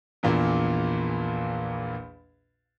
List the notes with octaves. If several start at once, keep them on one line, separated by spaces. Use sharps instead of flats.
A#1 E2 A#2 A#3